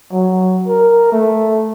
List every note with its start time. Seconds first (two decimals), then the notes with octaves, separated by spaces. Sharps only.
0.12 F#3
0.68 A#4
1.12 A3